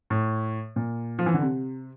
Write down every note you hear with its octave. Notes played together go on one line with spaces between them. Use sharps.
A2
A#2
F3
E3
D3
C3